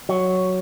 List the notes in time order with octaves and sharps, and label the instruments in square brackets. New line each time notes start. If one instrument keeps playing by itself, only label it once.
[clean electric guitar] F#3